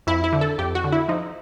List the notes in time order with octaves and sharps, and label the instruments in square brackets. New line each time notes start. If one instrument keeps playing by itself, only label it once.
[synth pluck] F2 E4
E4
D3
A4
F2 G4
F#4
D3
E4
F3 D#4